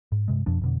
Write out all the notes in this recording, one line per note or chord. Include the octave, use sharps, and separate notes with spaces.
G#2
G2 C3 G#3
F2 B2 F3 D4
F2 B2 D3